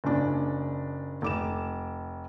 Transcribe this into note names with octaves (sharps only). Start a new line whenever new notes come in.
F#1 C#3 D4
F1 D6 E7